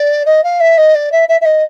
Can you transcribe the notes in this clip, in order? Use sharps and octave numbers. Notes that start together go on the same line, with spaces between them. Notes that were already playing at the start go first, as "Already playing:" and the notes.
Already playing: D5
D#5
F5
E5
D#5
D5
E5
E5
E5
D#5